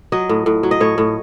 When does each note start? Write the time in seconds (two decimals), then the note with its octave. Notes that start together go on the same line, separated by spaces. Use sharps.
0.12 F#3 D#5
0.29 A2
0.46 A2
0.63 F#3
0.71 D#5
0.80 A2 C#5
0.98 A2